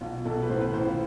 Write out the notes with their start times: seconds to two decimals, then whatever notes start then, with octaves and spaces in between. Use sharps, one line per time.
0.01 B1 F4
0.25 B1 A4
0.42 B4
0.49 A2 C5
0.61 B4
0.74 A2 C5
0.86 F4